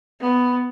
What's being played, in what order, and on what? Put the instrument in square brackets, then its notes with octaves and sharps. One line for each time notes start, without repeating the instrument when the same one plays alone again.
[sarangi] B3